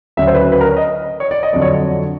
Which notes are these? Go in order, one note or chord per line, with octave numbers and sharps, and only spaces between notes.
D2 C#3 F#3 E5
C5
B4
B4
A#4
C#5
D#5
C#5
D5
D#5
F2 D3 F#3 D5
C#5